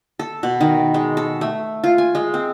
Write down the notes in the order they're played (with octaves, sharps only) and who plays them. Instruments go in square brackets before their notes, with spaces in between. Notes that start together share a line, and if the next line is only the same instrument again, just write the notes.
[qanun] A4
B2
D#3
G#3
A4
A3
F4
G#5
G#3
C4